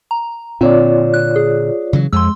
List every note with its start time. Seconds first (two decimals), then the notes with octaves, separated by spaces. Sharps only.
0.11 A#5
0.61 A#2 D3 C4 F4 C#5 D5
1.14 F#6
1.36 G#4
1.93 C#3 E3 F#3
2.13 F2 G#3 C6 E6